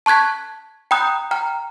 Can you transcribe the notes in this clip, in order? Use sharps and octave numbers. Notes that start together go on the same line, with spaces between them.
A5 C#6 F#6 G#6 B6
G5 A#5 B5 D#6 F#6 G6
G5 A#5 F6